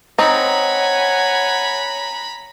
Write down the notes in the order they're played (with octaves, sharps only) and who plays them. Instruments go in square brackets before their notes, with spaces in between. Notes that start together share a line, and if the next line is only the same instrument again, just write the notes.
[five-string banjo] C4 D#4 [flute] C#5 [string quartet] F#5 G#5 [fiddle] A#5 B5